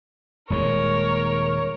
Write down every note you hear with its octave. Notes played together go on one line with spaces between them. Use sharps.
D#1 D#2 G#3 A#4 C#5